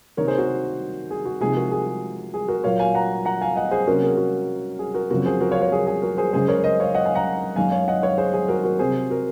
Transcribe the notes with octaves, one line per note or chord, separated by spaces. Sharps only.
C3 D#3 A#3 D#4 A#4 C#5
G#4 C5
F#4 A#4
G#4
F#4
C3 F3 G#3 D#4 G#4
F#4 A#4
G#4
G#4
F#4 A#4
A#2 F#3 A#3 C#5 F5
F5 G#5
F#5 A#5
F#5 A#5
F5 G#5
D#5 F#5
G#4 C5
C3 F#3 A#3 C#4 F#4 A#4
G#4
F#4
G#4
F#4 A#4
F#2 C#3 F3 C4 F#4 A#4
G#4 C5
F#4 A#4
C#5 F5
A#4 C#5
G#4
G#4
F#4 A#4
G#4 C5
F#2 C#3 G#3 C#4 G#4 C5
A#4 C#5
C5 D#5
C#5 F5
D#5 F#5
F5 G#5
F#5 A#5
F#2 D#3 G#3 D#4 F5 G#5
C#5 F5
D#5 F#5
C#5 F5
G#4 C5
G#4
F#4 A#4
F#4 A#4
C3 F#3 C4 G#4 C5
F#4 A#4